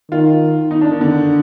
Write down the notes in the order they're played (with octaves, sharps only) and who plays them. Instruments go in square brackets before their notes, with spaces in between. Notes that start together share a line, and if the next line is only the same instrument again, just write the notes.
[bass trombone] D#3 [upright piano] F4
[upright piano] D#4
D4
D#3
D3